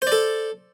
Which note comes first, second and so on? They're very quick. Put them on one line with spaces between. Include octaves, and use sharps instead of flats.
C5 D5 A4